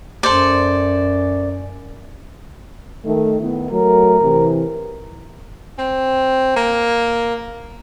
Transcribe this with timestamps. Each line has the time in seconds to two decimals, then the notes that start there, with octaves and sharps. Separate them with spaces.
0.23 F#2 A4 C5 D5
3.04 D#3 A3
3.40 D#3 B3 E4
3.71 F#3 A3 A#4
4.22 C3 E3
5.78 C4
6.56 A#3